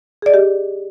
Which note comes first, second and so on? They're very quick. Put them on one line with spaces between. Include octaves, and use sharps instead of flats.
G#4 D5 D#5 G4